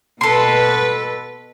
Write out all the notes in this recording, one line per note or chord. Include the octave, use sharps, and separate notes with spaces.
B2 A4 B4 C6